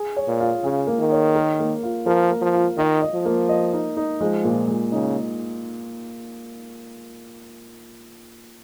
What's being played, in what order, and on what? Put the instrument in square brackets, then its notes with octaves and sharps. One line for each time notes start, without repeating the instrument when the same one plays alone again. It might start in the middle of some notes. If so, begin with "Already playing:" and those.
Already playing: [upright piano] G#4
C#5
[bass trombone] A#2
[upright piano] F4
[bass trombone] C#3 [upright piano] G#4
[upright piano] A#3
[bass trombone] D#3
[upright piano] C#5
A#4
A#3
F4
[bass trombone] F3 [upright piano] A#4
[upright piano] A#3
[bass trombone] F3
[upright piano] F4
[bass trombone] D#3 [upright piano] D#5
[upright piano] D#5
[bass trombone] F3
[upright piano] A#3
D#5
D#4
D#4
[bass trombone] F3 [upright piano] G#3
[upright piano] A#2
G#3
[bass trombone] C#3 [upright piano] D#4